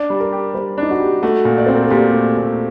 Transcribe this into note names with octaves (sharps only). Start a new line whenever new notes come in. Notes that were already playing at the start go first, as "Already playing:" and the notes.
Already playing: D4 D5
G3
A#4
G4
G3 C5
D4 D#4
F#4
G3 G4
A3 F#4
A#2
D5
C4 C5
A#4
A4
A#2 G4
A3
A#2